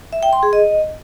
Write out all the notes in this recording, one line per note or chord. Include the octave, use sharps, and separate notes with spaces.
E5
G5
C6
G#4
D#5